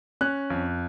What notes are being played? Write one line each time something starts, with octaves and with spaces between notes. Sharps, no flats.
C#4 F#6
F2